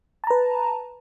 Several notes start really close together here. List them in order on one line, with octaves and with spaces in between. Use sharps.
A5 A#5 B4